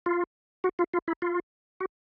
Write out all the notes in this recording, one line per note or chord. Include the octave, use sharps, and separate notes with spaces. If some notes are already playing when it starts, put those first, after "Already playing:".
F4
F#4
F4
F4
E4
F4
F#4